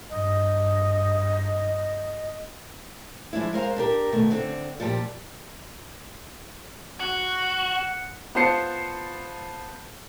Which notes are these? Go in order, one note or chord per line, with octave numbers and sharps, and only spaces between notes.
G2 D#5
F3 G#3 D4 E4
G#3 A#4 C5 F5
D4 G4 A#4
B2 D#3 A3
D3 C4
A#2 F3 G3 G4
F#4 F#5
B3 F4 C5 A5 C7 C#7